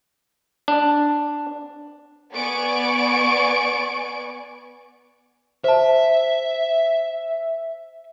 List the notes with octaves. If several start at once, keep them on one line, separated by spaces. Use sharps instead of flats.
D4
B3 D5 G#5 C#6 D7
C5 E5 A5